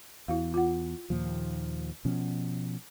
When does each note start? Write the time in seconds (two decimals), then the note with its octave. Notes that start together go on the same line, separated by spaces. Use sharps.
0.28 E2 E4 F#4 F5
0.54 F4 F#5
1.10 D#2 A#2 F3
2.05 B2 F3 C#4